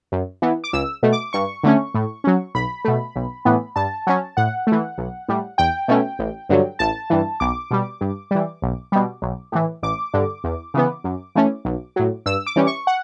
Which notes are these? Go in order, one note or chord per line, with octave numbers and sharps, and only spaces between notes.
F#2
E3 B3
D6
C#2 E6
B2 A3
D6
G2 C#6
D3 A3 C#4
A2
F#3 C#4
B1 B5
B2 A3
B1
A2 E3 B3
G2 A5
F#3 C#4
A2 F#5
A3
E3
B1
A2 G3
E2 G5
B2 A3 C#4
A1
G2 D3 F#3
A1 A5
G2 E3
B1 D6
B2 G3
G2
E3 G3
B1
B2 G3
B1
A2 E3
A1 D6
G2 D3
E2
C#3 E3 B3
F#2
E3 A3 C#4
B1
A2 F#3
G2 E6
D6
E3 G3 C#4
C#6
F#5